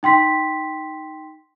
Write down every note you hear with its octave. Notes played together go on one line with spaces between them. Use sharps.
D#4 G5 C6 B6